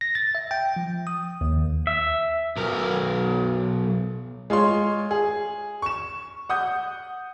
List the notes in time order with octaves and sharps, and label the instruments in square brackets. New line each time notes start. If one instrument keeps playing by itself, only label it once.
[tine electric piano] A#6
A6
E5
G5
F3
D#6
D#2
[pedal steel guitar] E5
[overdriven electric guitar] B1 A#4
[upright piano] G#3 F4 C#5 C6
G#4
C#6 E7
F#5 D#6 G6